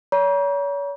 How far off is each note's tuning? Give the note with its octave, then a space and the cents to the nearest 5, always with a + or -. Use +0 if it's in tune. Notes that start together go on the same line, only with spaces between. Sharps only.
C#5 +40 A#5 +45